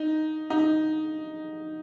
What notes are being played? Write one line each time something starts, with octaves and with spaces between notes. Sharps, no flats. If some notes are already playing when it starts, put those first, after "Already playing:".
Already playing: D#4
D#4